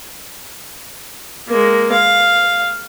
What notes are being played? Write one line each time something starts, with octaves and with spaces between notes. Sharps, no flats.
G#3 A#3
F5